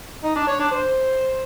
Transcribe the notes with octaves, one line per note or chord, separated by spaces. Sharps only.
D#4
D4
C#5
D4
C5